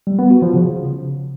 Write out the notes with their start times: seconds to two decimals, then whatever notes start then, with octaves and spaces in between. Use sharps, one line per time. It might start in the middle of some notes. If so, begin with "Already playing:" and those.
0.07 G3
0.19 B3
0.30 F#4
0.42 F3
0.54 C#3